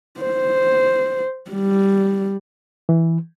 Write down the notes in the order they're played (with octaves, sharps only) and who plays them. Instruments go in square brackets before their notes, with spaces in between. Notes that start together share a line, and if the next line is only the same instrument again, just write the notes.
[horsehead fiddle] C5
G3
[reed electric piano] E3